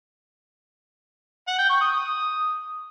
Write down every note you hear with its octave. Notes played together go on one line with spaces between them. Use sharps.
F#5
G5
C#6
D#6
D#6